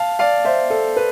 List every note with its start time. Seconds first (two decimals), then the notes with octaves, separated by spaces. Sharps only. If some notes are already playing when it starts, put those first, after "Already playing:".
Already playing: F5 A5
0.19 D5 F5
0.45 C5 E5
0.70 A4
0.97 B4